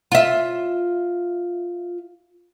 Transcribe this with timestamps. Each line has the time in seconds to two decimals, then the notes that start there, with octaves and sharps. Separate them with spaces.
0.12 F4 E5